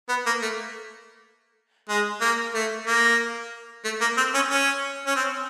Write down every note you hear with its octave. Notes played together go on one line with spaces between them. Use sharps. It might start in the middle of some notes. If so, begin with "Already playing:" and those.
B3
A#3
A3
G#3
A#3
A3
A#3
A3
A#3
C4
C#4
C#4
C#4
C4